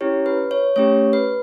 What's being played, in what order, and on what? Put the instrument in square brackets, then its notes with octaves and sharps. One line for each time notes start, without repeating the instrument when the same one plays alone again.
[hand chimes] C#4 E4 G4 C#5
B4
C#5
A3 C#4 G4 C#5
B4